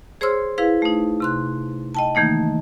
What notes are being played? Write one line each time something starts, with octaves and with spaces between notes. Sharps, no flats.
G#4 C5 C#5 C6 E6 F6
E4 G#4 B4 F5
A3 D#4
C3 C6 F#6
D#5 G5 A5
D#3 E3 A3 A#3 D#4